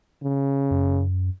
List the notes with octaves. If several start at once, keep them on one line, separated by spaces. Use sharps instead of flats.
C#3
F#2